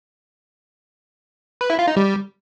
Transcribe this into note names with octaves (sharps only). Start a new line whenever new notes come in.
B4
E4
F4
D#4
G3